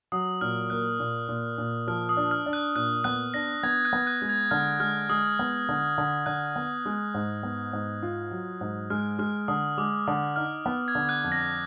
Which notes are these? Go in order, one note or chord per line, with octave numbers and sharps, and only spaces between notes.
F#3 D#6
A#2 F6
A#3 F#6
A#2
A#2
A#2
F3 F6
D#6
D4
F6
D4
F#6
A#2 F#6
B3 F#6
D4 A#6
B3 G#6
F#6
B3
F#6
G#3
G#6
D3 F6
G#3 F6
G#3 D#6
B3
D3
D3
D3 F#6
B3
G#3
G#2
B3
G#2
F4
F#3
G#2
G#3 F6
G#3 F6
D3 D#6
G#3 D6
D3 D#6
D#4 F6
B3
G#6
D3
F#6
F2
A#6